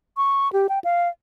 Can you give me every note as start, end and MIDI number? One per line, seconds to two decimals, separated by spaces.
0.17 0.51 85
0.53 0.67 67
0.69 0.79 79
0.84 1.08 77